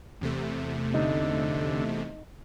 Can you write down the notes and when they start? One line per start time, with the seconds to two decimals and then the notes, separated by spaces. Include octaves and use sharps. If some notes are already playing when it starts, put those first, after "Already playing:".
0.21 E2 C3 A3
0.94 D3 D#4